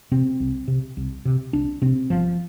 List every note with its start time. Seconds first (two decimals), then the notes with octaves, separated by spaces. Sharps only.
0.12 C3 C4
0.40 C2
0.68 C3
0.97 C2
1.25 C3
1.53 C2 D4
1.82 C3 C4
2.10 G1 F3